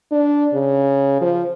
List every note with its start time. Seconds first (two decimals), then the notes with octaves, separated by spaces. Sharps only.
0.11 D4
0.54 C#3
1.21 F3